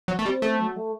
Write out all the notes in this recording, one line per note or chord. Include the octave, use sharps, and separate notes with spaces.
F#3
A3
G3 C4
A3
F#3
A3